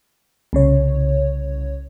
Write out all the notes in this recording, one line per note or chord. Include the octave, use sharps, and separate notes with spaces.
C2 C#3 C#5